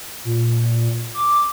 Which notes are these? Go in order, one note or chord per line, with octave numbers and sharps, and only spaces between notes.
A#2
D6